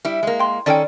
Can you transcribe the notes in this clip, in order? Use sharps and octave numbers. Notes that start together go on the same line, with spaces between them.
G3 E4
G#3 A#3
G5 C6
D#3 C#4 A4 D5 G5